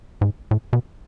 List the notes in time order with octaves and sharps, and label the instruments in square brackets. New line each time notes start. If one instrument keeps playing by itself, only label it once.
[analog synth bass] G#2
A2
B2